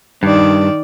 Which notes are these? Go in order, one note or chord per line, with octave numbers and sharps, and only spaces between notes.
G2 D#3 D5